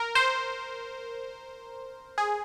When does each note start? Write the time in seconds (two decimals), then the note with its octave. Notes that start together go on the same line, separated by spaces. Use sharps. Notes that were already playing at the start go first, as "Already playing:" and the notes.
Already playing: A#4
0.15 C5
2.18 G#4